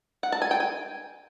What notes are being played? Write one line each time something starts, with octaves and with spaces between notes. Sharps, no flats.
F#5
A5
G#5
G5
G#5